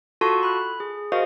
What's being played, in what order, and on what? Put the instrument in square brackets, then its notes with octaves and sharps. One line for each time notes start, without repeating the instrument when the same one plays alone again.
[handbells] F4 F#4 A4 A5 C6 C#6
B5 F#6
G#4
F#4 G#4 A#4 C5 D#5 F5